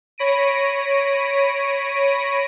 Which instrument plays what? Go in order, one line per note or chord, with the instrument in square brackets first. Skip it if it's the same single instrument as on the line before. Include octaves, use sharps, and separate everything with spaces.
[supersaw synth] C#5 B5 A#6 D7 D#7